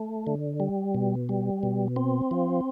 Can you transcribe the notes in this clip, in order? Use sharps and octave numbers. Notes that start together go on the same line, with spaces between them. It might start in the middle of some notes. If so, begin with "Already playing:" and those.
Already playing: A3
D3
G3
B2
G3
B2
C4
F3